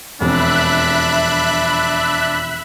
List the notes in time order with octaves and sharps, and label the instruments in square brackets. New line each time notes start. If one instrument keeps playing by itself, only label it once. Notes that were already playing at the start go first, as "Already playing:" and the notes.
[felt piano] E1 F2 [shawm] D4 [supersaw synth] E5 B5 F#6